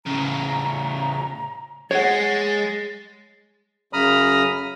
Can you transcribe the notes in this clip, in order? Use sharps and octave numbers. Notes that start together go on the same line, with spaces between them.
A2 C#3 A#5
G#3 C#5 F#5 A6
F#2 C#3 A#5 B5 D#6 F6